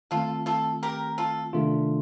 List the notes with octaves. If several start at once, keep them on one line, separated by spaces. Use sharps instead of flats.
D#3 A3 C4 F4 A4
F4 A4
G4 A#4
F4 A4
C3 D#3 A3 D4 F4